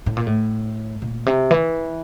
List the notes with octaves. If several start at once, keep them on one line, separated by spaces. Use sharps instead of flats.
A2
A#2
A2
A#2
C3
E3